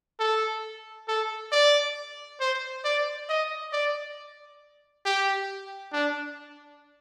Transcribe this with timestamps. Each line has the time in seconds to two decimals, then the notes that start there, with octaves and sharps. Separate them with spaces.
0.20 A4
1.09 A4
1.52 D5
2.40 C5
2.84 D5
3.29 D#5
3.73 D5
5.06 G4
5.93 D4